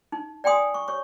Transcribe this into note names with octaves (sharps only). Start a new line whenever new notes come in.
D#4
D5 G5 G#5 C6 D#6
C#6
C#5 C#6